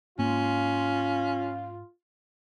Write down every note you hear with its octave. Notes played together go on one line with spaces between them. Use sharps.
G#2 A#3 C#4 F4